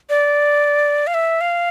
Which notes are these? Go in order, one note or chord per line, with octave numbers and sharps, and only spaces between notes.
D5
F5
E5
F5